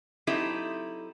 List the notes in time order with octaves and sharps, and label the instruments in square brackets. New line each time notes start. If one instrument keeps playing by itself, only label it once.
[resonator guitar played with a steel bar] F#3 C4 D#4 E4 G4 A4